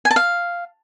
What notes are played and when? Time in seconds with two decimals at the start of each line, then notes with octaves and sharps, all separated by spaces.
0.05 G#5
0.11 A5
0.16 F5